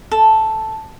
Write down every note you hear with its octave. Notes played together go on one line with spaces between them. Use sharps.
A4